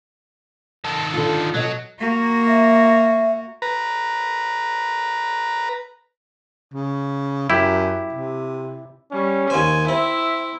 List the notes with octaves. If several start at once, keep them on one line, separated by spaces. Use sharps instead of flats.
D#3 A4
D3 F4
B2 F#3 D#5
A#3 F#4
E5
B4 A#5
C#3
F#2 E4 G4
C3
G3 C#4
D#2 C5 G#5
C4 E4 E5